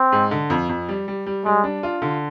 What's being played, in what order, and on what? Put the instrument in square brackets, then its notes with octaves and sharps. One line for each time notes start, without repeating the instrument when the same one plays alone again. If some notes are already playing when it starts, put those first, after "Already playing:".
Already playing: [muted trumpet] C4
[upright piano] G#2
D3
F2
F2
G3
G3
G3
[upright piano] G3 [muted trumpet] G#3
[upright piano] D4
F4
D3